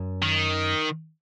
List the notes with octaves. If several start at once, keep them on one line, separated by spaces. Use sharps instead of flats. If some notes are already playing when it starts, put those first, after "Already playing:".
Already playing: F#2
D#3